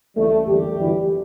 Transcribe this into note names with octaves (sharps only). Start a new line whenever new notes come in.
C#2 C#3 E3 G3 A3
F#1 E2 D3 G3 G4
G1 F#2 E3 G3